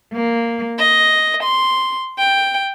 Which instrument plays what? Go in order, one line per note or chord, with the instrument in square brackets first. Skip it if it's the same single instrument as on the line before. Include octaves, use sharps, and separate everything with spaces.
[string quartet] A#3
D#5
C6
G5